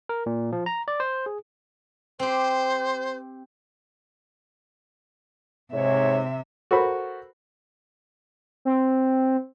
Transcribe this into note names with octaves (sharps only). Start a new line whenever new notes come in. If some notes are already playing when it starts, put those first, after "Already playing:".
A#4
A#2
F3
A#5
D5
C5
G#4
C4 G4 C5
G#2 C3 C#5 E5
F#4 A4 A#4 C5 B5
C4